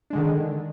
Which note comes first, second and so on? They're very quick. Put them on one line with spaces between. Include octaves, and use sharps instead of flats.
D4 G#3 D3 D#3